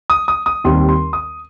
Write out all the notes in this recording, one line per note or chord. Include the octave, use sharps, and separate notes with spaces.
D#6
D#6
D#6
D#2 D#3 G3 C4 C6
C6
D#6